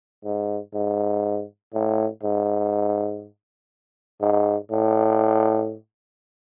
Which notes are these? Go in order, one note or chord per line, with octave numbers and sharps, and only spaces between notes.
G#2
G#2
A2
G#2
G#2
A2